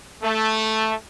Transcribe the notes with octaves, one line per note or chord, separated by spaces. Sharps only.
A3